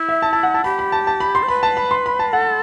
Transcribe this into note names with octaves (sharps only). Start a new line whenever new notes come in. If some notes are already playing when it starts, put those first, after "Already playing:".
Already playing: E4
E5
A5
A5
F#5
A5
G4 B5
B5
A5
A5
B5
C6
C5
B4 B5
A5
B5
C6
B5
A5
A4 F#5